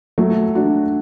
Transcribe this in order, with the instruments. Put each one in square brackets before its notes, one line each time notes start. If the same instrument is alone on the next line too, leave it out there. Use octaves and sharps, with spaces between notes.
[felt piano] F#3 A3
D4 F#4